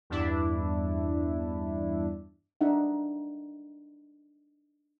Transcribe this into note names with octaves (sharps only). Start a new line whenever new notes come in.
E2 G2 D4 E4
D4 D#4 E5 F#5